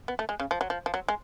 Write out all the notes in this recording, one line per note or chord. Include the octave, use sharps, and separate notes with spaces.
B3
A3
G#3
C#3
F3
F#3
F3
F3
F#3
G#3